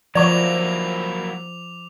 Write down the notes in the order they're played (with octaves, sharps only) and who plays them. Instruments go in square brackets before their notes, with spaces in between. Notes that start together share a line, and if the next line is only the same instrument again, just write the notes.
[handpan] F3 [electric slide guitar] F#3 A#3 E4 [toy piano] D5 C#6 [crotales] D6 F7